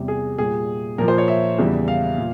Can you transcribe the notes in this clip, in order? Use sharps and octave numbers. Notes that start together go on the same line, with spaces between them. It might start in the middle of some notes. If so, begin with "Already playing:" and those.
Already playing: E2 C3 G3
G#4
A#2 G3 G#4
A#2 F3 A#4
C5
C#5
E5
E2 C#3 E3 G3
F5
A#2